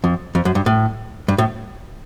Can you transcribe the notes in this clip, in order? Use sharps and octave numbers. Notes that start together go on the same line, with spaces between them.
F2
F2
F#2
G2
A2
G2
A2